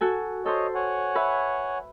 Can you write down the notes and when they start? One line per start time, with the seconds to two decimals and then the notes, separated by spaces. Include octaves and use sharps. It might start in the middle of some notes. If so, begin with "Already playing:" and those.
0.01 F#4 A4 G#5
0.46 A4 C5 C#5 D#5
0.75 C#5 F#5 G#5
1.15 B4 E5